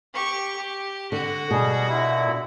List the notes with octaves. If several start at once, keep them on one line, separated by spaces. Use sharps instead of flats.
G4 C#6
G4
D3 F#4
B2 G3 G#4
A#2 D3 E4